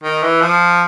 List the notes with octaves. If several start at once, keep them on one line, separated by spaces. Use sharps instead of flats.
D#3
E3
F3